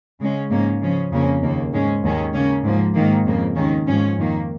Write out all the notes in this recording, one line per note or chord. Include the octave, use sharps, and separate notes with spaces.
C#3 G#3 C#4
G#2 F3 A#3 C#4
C#3 F3 C#4
F2 C#3 A#3 C#4
D#2 C#3 A#3
G#2 G#3 C#4
D#2 D#3 G#3 C#4
C#3 A#3 C#4
G#2 F3 A#3
G#2 D#3 A#3
F2 C#3 A#3
D#2 D#3 G#3 C#4
G#2 F3 C#4
F2 D#3 A#3